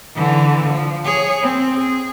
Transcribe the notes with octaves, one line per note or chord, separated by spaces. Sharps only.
D3 E3
F3
G#4 C#5
C4
G#4